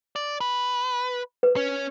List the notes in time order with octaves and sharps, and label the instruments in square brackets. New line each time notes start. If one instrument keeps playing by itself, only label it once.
[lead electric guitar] D5
B4
[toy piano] B4
[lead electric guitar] C#4